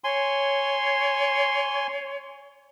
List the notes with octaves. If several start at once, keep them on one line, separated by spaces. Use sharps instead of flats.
C#5 G#5 C6